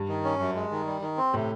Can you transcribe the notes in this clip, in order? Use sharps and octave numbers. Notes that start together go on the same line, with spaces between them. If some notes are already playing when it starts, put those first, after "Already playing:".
Already playing: G2
D#3
C#4
F#2
G#3
D#3
G3
D#3
C4
A2 C3